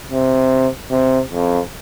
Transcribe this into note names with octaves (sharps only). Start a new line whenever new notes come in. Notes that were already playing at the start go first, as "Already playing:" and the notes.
C3
C3
F2